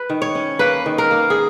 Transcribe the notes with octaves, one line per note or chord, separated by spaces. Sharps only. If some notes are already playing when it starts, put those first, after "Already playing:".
Already playing: B4
D#3
C#5
C#4
A#3 B4
D#3
A#4
A#3
G#4